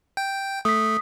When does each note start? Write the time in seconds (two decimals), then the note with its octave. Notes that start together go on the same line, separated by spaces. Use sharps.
0.17 G5
0.65 A3 D#6 B6